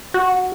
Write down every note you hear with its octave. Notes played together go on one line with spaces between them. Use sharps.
F#4